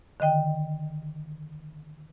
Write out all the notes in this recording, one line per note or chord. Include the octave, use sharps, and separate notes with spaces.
D3 D#3 D#5 G5